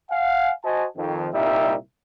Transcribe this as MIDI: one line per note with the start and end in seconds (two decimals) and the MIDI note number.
0.10 0.52 77
0.10 0.52 78
0.10 0.52 80
0.64 0.86 66
0.64 0.86 72
0.64 0.86 75
0.64 0.86 80
0.64 0.86 81
0.97 1.28 41
0.97 1.28 51
1.34 1.76 36
1.34 1.76 46
1.34 1.76 55
1.34 1.76 63
1.34 1.76 76